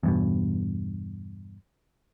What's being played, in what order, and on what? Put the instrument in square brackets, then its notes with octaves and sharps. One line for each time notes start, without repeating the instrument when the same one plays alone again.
[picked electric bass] E2 G2 B2